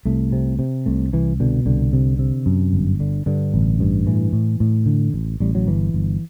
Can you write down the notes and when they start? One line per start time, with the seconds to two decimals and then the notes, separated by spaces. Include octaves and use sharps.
0.05 C2 A3
0.32 C3
0.59 C3
0.86 C2 A3
1.13 C2 E3
1.40 B2 D3
1.66 C2 D3
1.93 C3
2.19 C3
2.46 F#2
2.73 G1
3.00 D3
3.26 G2 D3
3.54 A1
3.80 G2
4.06 A2 E3
4.33 A2
4.60 A2
4.86 D3
5.14 A1
5.40 A1 G3
5.55 F#3
5.67 G1 E3
5.94 G1